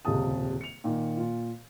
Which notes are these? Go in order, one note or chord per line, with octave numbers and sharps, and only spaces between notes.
D#1 C#2 C3 G#3 A5 D#6
C#7 F7
A#2 D#3 A#3
A#2 F4